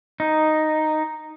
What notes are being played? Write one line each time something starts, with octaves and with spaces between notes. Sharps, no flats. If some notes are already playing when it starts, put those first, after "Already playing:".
D#4